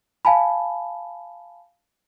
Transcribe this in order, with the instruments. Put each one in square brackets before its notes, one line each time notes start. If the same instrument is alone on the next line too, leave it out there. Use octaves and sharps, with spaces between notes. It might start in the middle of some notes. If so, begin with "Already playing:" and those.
[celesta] F5 G#5 A5 B5